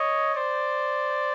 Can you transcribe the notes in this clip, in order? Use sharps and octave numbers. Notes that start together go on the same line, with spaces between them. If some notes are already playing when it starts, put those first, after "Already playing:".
Already playing: C#5 D#5
C5 D5